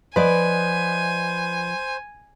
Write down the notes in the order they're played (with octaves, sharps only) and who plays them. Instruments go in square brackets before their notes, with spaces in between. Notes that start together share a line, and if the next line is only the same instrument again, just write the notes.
[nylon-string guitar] F3 D5 [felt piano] B4 D#5 [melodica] C5 [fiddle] G#5